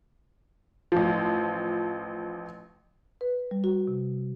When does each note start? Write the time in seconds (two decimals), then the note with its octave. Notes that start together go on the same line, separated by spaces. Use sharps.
0.92 A1 F3
3.21 B4
3.51 G3
3.64 F#4
3.88 C3